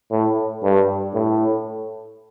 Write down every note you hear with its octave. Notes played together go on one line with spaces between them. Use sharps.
A2
G2
A2